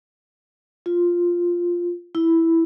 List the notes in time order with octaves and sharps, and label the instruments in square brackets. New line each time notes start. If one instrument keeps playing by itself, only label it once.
[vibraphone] F4
E4